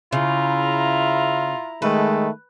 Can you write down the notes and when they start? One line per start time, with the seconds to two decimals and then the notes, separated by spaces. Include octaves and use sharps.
0.13 C#3 E4 F4 A#5
1.82 D#3 G#3 A3 B4